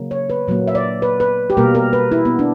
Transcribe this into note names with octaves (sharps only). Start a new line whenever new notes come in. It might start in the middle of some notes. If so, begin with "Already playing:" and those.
Already playing: C#3 F#3 A#3
C#5
B4
A#2 F#3 A#3
E5
D5
B4
B4
G4
B2 G3 A#3 A#4
A#4
B4
E4
B3
D4